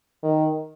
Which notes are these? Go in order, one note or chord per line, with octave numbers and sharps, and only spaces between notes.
D#3